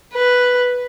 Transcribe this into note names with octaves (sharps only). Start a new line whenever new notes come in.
B4